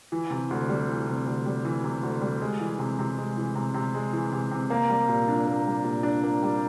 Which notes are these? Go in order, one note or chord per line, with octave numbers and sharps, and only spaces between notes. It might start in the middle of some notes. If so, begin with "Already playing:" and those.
E3
C3
D2
G3
E3
C3
D2
G3
E3
C3
D2
G3
G#3
E3
C3
C3
G#3
E3
C3
C3
G#3
E3
C3
C3
A#3
G3
A#2
D4
A#3
G3
A#2
D4
A#3
G3